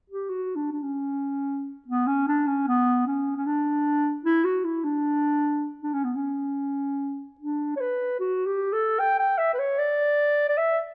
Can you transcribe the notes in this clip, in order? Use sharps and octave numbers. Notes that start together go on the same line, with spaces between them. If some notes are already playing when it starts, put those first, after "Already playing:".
G4
F#4
D4
D4
C#4
B3
C#4
D4
C#4
B3
C#4
C#4
D4
E4
F#4
E4
D4
D4
C#4
B3
C#4
D4
C#5
B4
F#4
G4
A4
G5
G5
E5
B4
C#5
D5
D5
E5